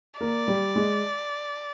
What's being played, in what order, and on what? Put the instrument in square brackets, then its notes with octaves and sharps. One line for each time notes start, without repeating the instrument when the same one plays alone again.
[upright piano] A#3 [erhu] D5
[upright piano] G3
G#3